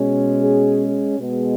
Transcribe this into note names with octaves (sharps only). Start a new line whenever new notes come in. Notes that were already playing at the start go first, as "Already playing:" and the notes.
Already playing: B2 G#3 C#4
G#4
B2 G#3 B3